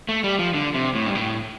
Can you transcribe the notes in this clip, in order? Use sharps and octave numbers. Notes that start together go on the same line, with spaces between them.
A3
G3
F3
D3
C3
A2
G2
A2